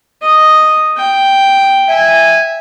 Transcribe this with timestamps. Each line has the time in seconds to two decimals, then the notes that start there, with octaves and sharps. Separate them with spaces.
0.22 D#5
0.97 G5
1.89 E5 G#5